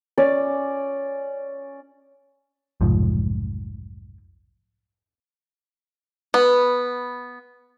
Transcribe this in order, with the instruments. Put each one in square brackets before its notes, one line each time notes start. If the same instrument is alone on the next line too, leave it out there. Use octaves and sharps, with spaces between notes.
[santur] C#4 D5
[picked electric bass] F1 B1 G#2 F3
[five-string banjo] B3